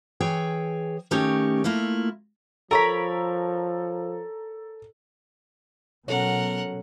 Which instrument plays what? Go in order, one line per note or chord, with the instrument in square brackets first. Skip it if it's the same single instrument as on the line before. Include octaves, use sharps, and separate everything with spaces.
[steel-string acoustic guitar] E3 G#4 C#5 G5
D#3 A3 C#4 D#4 G4 C#5
A3 A#3 E4 F4
[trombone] F3 [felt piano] A4 A#5 [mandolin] A#4 C#5 B5
[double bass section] B2 F#3 [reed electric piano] C#4 A4 C#5 [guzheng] F#4 [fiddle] A#4 F#5